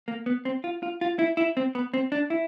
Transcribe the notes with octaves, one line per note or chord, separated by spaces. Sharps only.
A#3
B3
C4
F4
F4
F4
E4
E4
C4
B3
C4
D4
E4